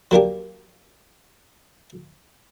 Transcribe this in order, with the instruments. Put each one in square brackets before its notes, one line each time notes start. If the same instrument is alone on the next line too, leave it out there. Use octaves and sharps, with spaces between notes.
[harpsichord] F#3 A#3 D4 G4